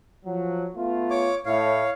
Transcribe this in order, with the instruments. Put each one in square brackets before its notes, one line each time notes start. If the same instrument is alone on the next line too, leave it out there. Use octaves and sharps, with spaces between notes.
[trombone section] F3 F#3
A3 B3 F4
[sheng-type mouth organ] C#5 D6
[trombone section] A2 [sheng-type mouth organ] C#5 F5